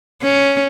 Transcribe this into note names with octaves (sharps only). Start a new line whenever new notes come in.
C#4